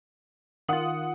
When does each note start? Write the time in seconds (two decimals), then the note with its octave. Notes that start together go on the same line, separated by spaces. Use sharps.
0.69 D#3 F4 F#5 D#6 F#7